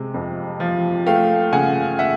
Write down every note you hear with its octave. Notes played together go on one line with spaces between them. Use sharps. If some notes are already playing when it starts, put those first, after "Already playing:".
Already playing: C3 G#3
F2
F3
A3 F5 G5
C#3 F#5 G#5
E5 F#5